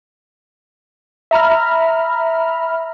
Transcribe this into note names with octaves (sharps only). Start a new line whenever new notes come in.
E5 A#5 B5 F6